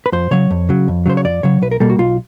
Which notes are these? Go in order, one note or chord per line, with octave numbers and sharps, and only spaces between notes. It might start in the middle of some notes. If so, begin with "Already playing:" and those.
B4
F2 C5
C#3 F#3 C#5
F2
C#3 F#3
F2
C#3 F#3 C5
C#5
F2 D5
C#3 F#3 C#5
B1 B4
A#4
B2 G3 A#3 A4
F#4
B1 F4